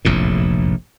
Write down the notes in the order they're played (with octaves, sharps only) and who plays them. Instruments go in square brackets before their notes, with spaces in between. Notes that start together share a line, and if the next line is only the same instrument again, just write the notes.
[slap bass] F1 A#1 E2 A2